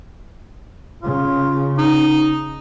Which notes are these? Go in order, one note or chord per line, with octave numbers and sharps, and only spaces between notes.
C#3 F4
D#4